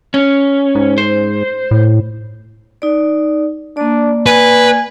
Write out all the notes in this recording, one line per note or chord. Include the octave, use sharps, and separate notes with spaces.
C#4
G#2
C5
A2
D#4 D5
A#3 D4 D5
B4 G#5